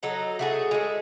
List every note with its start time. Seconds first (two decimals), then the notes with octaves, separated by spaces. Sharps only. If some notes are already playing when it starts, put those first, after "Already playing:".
0.03 F#3 D#4 A4
0.39 A3 F#4 G#4
0.71 G#3 A3